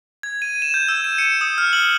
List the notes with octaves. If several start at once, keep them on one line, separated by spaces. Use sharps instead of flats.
G#6
D#7
E7
G6
E6
D#7
C#7
D#6
F6
F#7